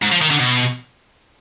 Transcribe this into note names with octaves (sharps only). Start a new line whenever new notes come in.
G#2
F3
D#3
D3
B2